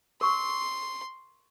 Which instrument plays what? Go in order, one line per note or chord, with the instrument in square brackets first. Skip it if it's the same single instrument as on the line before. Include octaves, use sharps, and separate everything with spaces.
[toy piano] A#4 C#6 [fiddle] C6